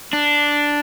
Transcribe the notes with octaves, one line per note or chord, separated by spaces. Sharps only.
D4